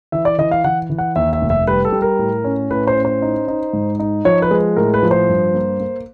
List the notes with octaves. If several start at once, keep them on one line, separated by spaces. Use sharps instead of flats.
E3 E5
D5
E3 D#5
F5
E3 F#5
E3
F#5
D#2 E5
E5
F1
E5
G3 B4
A4
G3
A#4
A2
C#4
A2 B4
C5
C#4
C5
D#4
D#4
G#2
D#4
F3 C#5
B4
G#3
A2 A#4
B4
F3
C5
G2
A#3
A#3